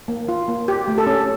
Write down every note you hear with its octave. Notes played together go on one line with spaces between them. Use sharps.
A#3
F4
A#3
G4
A3
A4
C#4